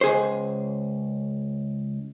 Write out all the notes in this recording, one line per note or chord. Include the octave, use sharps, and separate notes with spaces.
C#2 G#4 C5